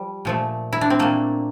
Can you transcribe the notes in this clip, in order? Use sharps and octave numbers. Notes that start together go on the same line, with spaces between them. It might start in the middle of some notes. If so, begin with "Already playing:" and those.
Already playing: F3 G3
A#2 F3 A3
E4
D4
C4
A#2 A3 A#3